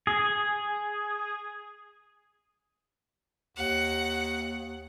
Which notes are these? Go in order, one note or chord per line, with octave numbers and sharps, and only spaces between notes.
G#4
D#2 F#5